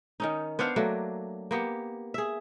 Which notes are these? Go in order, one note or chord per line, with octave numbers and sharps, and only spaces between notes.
D#3 C#4 D#4
B3 D4 C5 F5
F#3 A3 A#3 D4
A#3 B3 G4
G#4 E5